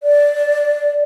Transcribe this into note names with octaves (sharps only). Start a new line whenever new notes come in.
D5